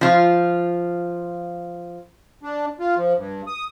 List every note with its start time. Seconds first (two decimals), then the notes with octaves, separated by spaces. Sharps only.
0.01 F3 F4
2.43 D4
2.80 F4
2.97 F3
3.17 G2
3.47 D#6